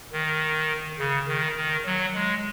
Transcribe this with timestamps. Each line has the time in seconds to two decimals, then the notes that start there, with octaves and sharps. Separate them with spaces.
0.12 D#3
0.99 C#3
1.28 D#3
1.57 D#3
1.86 F#3
2.15 G#3